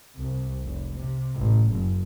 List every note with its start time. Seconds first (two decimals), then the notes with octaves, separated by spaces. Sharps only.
0.17 C2
0.63 F1
0.97 C3
1.35 A1
1.71 F#1